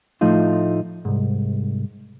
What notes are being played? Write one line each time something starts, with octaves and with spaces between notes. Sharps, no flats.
A2 F3 A3 D#4 F4
C2 G#2